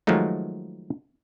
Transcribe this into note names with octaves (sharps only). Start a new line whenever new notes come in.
D#3 F3 F#3 G#3 A3 D#4